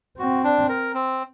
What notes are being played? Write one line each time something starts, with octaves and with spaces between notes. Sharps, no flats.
C4 F#4
D4
A#4
C4